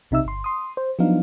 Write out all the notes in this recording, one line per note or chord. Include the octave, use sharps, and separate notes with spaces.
B1 C3 D#4 E5 E6
G1 C6
C6 D#6
C5
F3 F#3 B3 D4 D#4 F5